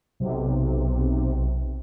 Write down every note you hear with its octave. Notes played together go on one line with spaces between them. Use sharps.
B1 C3